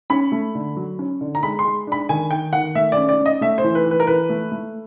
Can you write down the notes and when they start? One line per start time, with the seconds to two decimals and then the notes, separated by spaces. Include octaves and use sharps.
0.10 C#4 B5
0.32 A3
0.55 D3
0.77 F#3
0.99 C#4
1.21 D3
1.35 A#5
1.43 G#3 B5
1.59 C6
1.65 G#3
1.87 D4 B5
2.09 D#3 G#5
2.31 D#3 G5
2.53 D#3 F#5
2.75 A3 E5
2.92 C#4 D5
3.09 D5
3.20 C#4
3.26 D#5
3.41 A3 E5
3.58 C5
3.64 E3
3.75 B4
3.86 E3 B4
4.00 A#4
4.07 E3 B4
4.30 A3
4.52 A3